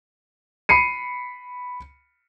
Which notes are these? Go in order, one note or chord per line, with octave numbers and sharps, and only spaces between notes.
B5 C7 C#7 D#7